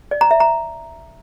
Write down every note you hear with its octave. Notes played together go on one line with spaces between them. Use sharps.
D5
A#5
E5
A#5